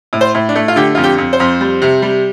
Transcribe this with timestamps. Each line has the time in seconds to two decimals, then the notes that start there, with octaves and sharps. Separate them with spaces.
0.13 A2
0.21 C5
0.34 A2
0.49 D4
0.55 A3
0.68 F4
0.76 D3 G4
0.95 F2 F4
1.04 G4
1.18 F2
1.33 C5
1.40 F2
1.61 G3
1.82 C3
2.02 G3